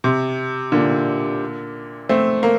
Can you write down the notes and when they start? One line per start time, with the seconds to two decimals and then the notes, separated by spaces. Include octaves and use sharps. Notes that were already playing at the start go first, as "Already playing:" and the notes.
0.04 C3
0.72 A#2 D3
2.09 A3 C4
2.43 A#3